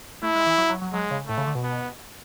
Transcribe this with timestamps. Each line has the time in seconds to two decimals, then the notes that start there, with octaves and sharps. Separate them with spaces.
0.22 A3 E4
0.35 G#3
0.46 E3
0.58 F#3
0.69 F#3
0.81 F#3
0.93 F#3 G#3
1.11 C#3
1.28 A2 A3
1.38 C#3
1.47 D3
1.55 B2
1.64 B3